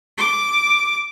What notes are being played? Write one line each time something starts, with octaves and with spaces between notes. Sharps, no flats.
D6